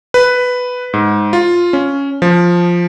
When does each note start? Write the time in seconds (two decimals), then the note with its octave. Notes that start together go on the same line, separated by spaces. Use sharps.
0.14 B4
0.94 G#2
1.33 F4
1.73 C#4
2.22 F3